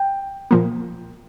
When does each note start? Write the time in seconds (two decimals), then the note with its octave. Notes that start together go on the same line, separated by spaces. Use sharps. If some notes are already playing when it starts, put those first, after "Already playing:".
Already playing: G5
0.51 A#2 F3 A#3